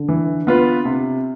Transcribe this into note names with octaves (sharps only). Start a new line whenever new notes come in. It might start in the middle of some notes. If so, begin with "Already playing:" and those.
Already playing: D3
E3
B3 F4 B4
C3